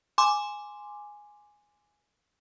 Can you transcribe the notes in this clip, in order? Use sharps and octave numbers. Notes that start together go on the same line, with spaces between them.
G#5 C6 D6